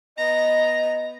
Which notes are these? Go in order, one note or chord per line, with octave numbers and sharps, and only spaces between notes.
B3 D#5 A#5